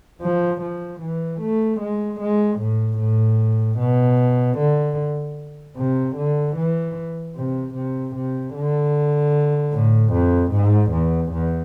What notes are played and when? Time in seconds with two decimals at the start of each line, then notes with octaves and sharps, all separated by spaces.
0.21 F3
0.61 F3
1.00 E3
1.41 A3
1.80 G#3
2.20 G#3
2.59 A2
2.99 A2
3.79 B2
4.58 D3
5.77 C3
6.16 D3
6.56 E3
7.35 C3
7.74 C3
8.15 C3
8.54 D3
9.73 A2
10.13 F2
10.52 G#2
10.92 E2
11.32 E2